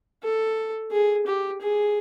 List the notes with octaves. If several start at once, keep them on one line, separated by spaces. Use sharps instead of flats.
A4
G#4
G4
G#4